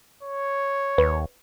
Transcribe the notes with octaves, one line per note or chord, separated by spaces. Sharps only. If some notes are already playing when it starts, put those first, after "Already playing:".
C#5
D#2 B4